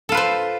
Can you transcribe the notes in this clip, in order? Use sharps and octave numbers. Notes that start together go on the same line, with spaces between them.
F4 A4 B4 C5